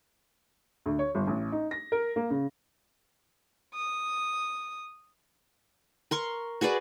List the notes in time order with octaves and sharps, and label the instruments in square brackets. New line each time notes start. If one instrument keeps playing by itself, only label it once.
[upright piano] D2
C#5
G1
A1
D#4
A#6
A#4
A#3
C#3
[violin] D#6
[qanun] A#4 C6 C#6
F#4 G#4 B4 D5